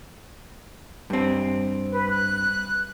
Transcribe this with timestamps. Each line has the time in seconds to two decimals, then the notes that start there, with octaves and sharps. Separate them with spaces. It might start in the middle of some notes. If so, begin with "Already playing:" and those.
1.10 G2 C4
1.91 B4
2.10 F#6